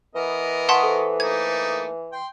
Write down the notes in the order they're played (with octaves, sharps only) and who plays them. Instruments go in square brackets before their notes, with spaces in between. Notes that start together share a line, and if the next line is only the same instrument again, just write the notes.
[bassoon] E3 [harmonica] B3 A#4 D#5
[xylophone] F#5 A5 C6 [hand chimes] C#6 D#6 B6
[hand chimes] A4 C5
[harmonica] A3 A#3 D#4 [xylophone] G#6
[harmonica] G5 C6